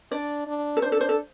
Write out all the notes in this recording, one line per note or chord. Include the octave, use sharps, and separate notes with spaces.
D4 D5
D4
A4
D4 C5
A4
C5
A4